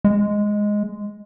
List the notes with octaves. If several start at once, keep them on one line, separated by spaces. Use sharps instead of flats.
G#3